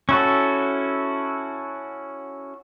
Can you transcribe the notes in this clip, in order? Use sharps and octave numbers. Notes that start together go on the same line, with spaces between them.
C#4 E4 F#4 A4